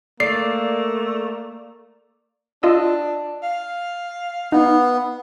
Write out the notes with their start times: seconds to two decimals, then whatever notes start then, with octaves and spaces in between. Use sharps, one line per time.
0.20 A3 A#3 D5 C7
2.63 D4 F4 D#5 E6
3.43 F5
4.52 B3 D#4